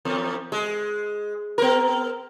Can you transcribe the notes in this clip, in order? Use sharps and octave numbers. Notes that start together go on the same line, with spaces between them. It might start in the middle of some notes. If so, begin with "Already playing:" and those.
E2
G#3
B3 A#4